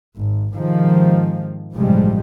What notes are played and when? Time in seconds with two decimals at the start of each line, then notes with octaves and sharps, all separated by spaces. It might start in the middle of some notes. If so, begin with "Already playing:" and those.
0.18 G#1
0.54 G#2 C3 D#3 F3 G#3
1.74 A1 G2 C3 F3 G3 G#3